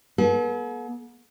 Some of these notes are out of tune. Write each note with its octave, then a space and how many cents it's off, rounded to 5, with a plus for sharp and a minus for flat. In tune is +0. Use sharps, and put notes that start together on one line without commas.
B3 -40 A4 -45